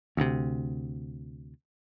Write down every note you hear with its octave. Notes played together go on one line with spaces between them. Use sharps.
D2 C3